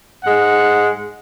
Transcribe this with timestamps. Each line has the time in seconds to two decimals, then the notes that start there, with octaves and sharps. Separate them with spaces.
0.24 G#2 G#3 F#5